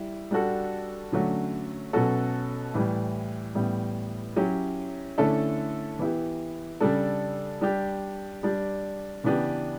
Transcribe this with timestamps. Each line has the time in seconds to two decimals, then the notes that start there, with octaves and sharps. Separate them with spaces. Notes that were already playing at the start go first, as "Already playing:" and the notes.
Already playing: G3 E4
0.31 G3 D4 F#4 A4
1.12 D3 F#3 A3 C#4 F#4
1.93 B2 F#3 C#4 F#4 A4
2.74 A2 E3 G3
3.55 A2 E3 G3 B3
4.36 F#3 C#4 E4 G4
5.18 D3 A3 C#4 E4 A4
5.99 E3 B3 E4 G4
6.80 C#3 G3 D4 A4
7.61 G3 D4 G4
8.43 G3 D4 G4
9.24 C#3 E3 B3 D4 G4